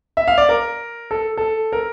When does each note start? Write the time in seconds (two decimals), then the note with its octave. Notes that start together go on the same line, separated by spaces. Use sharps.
0.17 E5
0.28 F5
0.38 D5
0.49 A#4
1.11 A4
1.37 A4
1.72 A#4